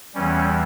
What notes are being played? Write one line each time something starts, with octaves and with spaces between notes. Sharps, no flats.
E2 E3 G3 C#4